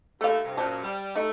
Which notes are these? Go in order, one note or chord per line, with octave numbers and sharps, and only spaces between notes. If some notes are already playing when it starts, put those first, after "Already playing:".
D#2 A3 A4 F5
G2 C3
F#2 A#2 C5 A5
G3
A3 D#4